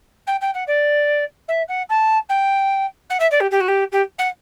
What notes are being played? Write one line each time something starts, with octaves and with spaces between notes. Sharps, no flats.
G5
G5
F#5
D5
E5
F#5
A5
G5
F#5
E5
D5
G4
G4
F#4
G4
G4
F#5